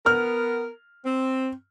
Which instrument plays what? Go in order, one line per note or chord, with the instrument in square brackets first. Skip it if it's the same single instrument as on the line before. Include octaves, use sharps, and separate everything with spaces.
[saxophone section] B3 A#4 [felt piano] F6
[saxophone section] C4